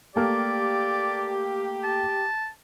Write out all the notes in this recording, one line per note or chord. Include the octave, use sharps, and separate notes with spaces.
A3 A#3 G4 D5 F6
A5